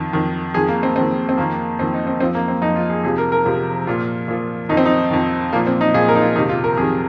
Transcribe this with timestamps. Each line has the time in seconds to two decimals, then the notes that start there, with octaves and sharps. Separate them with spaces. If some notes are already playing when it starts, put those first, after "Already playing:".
Already playing: F2 D#3
0.13 F2 D#3
0.54 F2 D#3 G#4
0.68 A#3
0.83 C4
0.96 F2 D#3 C4
1.29 C4
1.37 F2 D#3 A#3
1.79 F2 D#3 C4
1.94 D#4
2.07 C4
2.20 F2 F3 C4
2.35 A#3
2.48 C4
2.62 F2 F3 D#4
2.76 F4
2.90 G#4
3.03 F2 C3 F3 G#4
3.18 A#4
3.32 A#4
3.45 F2 C3 F3
3.87 A#2 F3 F4
4.28 A#2 F3
4.69 F2 D#3 D#4
4.77 C4
4.86 D#4
5.11 F2 D#3
5.53 A#2 F3 A#3
5.67 C4
5.81 D#4
5.94 A#2 F3 G#4
6.09 A#4
6.15 D#4
6.22 F4
6.36 F2 C3 D#3 D#4
6.49 F4
6.64 A#4
6.77 F2 C3 D#3 G#4